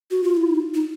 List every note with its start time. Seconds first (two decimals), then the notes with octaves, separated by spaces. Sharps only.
0.11 F#4
0.24 F4
0.37 E4
0.49 D#4
0.75 D#4